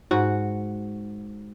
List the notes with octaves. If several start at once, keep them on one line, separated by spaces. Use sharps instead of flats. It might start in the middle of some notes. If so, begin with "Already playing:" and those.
G#2 F#4